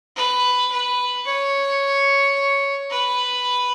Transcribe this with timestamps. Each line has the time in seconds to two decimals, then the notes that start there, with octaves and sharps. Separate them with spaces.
0.17 B4
0.72 B4
1.27 C#5
2.91 B4